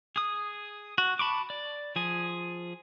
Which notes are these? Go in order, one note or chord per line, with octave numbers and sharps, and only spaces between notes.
G#4 D#6
F#4
A5 B5 C#6 D6
D5
F3 G#4 G#5